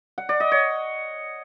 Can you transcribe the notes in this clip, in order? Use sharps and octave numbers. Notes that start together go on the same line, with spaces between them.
F#5
D5
D#5
C#5